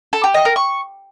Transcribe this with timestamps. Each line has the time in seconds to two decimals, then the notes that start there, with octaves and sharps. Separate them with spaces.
0.13 A4
0.24 G4
0.34 D#5
0.45 A#4
0.56 C#6